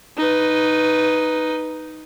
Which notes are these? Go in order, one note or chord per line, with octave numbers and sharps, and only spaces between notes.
D#4 B4